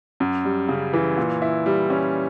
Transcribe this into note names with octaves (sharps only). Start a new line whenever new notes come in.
F#2
G3
C#3
E3
A#2
E4
G3
C#4